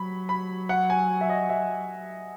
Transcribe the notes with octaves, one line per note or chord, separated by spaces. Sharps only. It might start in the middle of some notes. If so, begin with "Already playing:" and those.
Already playing: F#3 B5
B5
F#5
G#5
E5
D#5
E5